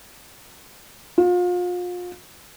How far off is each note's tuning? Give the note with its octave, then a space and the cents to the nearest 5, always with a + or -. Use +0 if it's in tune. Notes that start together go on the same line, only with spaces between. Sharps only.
F4 +35